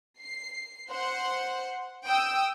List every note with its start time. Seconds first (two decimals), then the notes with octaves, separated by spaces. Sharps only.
0.20 C7
0.90 C5 F#5 C6
2.06 G5 D#6 E6